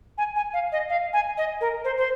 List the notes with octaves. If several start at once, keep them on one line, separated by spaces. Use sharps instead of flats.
G#5
G#5
F5
D#5
F5
G#5
D#5
A#4
C5
C5